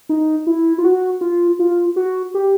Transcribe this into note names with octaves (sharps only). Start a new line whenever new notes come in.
D#4
E4
F4
F#4
F4
F4
F#4
G4